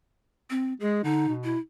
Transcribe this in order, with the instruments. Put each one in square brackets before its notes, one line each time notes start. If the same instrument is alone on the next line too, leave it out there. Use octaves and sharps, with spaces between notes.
[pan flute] C4
[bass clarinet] G#3 [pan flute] G#4
[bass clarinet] D3 [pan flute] D#4
[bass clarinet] B2
[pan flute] E4